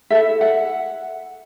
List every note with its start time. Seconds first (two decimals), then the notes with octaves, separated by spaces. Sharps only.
0.10 E4 A4 E5
0.41 F#5